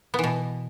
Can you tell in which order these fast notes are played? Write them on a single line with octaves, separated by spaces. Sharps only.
B3 E3 B2